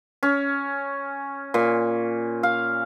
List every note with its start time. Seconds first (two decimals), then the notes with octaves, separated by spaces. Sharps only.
0.23 C#4
1.54 A#2
2.43 F5